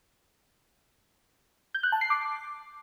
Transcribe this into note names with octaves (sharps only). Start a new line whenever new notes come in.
G6
F#6
A5
C7
D6